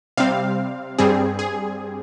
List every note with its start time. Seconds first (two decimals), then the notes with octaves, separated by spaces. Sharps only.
0.17 C3 G3 C4 F5
0.98 G2 G3 C4 G#4
1.39 G#4